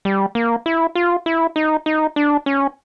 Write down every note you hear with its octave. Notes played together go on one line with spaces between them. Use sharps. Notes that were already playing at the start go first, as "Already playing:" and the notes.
G3
A#3
E4
F4
E4
D#4
D#4
D4
C#4